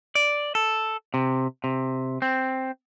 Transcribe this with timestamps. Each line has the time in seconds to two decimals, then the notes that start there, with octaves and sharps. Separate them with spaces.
0.15 D5
0.55 A4
1.14 C3
1.64 C3
2.22 C4